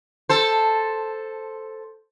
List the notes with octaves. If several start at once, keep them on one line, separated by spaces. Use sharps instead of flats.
A4 C5